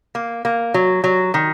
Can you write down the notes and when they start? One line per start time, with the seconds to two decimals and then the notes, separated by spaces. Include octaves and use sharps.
0.15 A#3
0.45 A#3
0.74 F#3
1.04 F#3
1.34 D#3